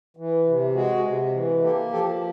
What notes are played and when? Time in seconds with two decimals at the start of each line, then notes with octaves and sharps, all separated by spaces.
0.17 E3
0.46 C3
0.74 G#3 F#4 G#4
1.03 C3
1.32 E3
1.62 A#3 G4 A4
1.91 F3 G4 A4